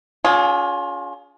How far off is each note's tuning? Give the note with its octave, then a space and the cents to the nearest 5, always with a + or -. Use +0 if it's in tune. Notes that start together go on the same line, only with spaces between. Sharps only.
C#4 +40 F4 +30 G#4 +0